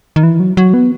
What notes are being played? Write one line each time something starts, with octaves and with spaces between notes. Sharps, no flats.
D#3
E3
F#3
F#3
B3